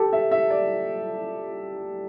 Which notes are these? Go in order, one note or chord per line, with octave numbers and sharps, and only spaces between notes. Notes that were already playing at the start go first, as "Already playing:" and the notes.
Already playing: G4 A4
E5
E5
D5